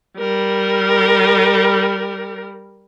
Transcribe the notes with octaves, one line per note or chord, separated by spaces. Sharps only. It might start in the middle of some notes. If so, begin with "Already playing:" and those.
G3 A#4